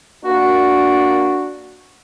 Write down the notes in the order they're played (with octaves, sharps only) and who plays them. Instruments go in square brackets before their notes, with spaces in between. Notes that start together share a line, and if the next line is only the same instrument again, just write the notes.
[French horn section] A#3 D4 [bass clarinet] F#4